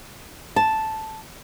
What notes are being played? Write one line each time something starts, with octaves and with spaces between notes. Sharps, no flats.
A5